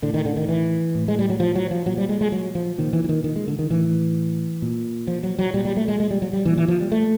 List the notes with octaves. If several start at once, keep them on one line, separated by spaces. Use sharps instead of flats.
A2 D3
D#3
D3
D#3
E3
A2
G#3
G3
F#3
F3
F#3
F3
A#2 F#3
G3
G#3
G#3
F#3
F3
A#2 D#3
E3
E3
D#3
D#3
G#3
D3
D#3
A2 E3
A#2
F3
F#3
F#3
A#2 G3
G3
A3
G#3
G#3
G3
F#3
G3
A#2 E3
E3
F3
G3
A3